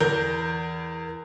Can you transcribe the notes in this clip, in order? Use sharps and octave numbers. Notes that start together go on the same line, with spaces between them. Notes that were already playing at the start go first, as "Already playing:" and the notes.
E2 A#4 G6